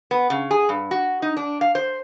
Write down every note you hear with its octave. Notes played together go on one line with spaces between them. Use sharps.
B3
C#3
G#4
G2
F#4
D#4
D4
F5
C5